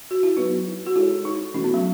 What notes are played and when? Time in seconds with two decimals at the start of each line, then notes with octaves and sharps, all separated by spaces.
0.11 F#4
0.23 E4
0.37 F#3 B3 D#4 E4 B4
0.87 F#4
0.95 G#3 D#4 E4 A4 C#5
1.25 D#4
1.54 E3 A3 C#4 D#4 F#4
1.64 B3
1.74 F#3